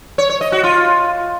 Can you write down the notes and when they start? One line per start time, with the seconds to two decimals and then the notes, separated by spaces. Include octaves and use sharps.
0.18 C#5
0.30 C#5
0.41 D#5
0.52 F#4
0.64 F4